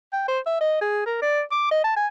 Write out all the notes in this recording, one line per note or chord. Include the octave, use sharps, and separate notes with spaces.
G5
C5
E5
D#5
G#4
A#4
D5
D6
D#5
A5
G#5